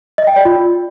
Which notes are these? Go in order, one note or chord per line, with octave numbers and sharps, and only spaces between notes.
D#5
G5
D5
F4